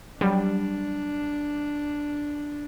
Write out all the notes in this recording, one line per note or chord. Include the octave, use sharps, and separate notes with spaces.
F#3 G3 D4